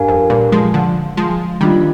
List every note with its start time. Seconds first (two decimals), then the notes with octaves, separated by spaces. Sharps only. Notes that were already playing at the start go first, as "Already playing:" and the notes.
Already playing: G2 D4 G4 A#4 F5 G#5
0.08 F2
0.30 G2 A#2
0.52 F3 G#3
0.74 D3 F3
1.17 F3 G#3
1.61 D#3 G3 A#3 D4 F4